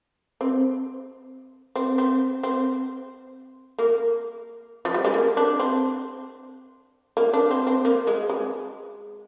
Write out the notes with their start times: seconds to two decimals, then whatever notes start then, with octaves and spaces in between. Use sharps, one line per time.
0.41 C4
1.76 C4
1.98 C4
2.43 C4
3.78 A#3
4.85 F3
4.94 G3
5.05 G#3
5.14 A#3
5.37 D4
5.59 C4
7.17 A#3
7.33 D4
7.51 C4
7.67 C4
7.85 A#3
8.07 G#3
8.29 G#3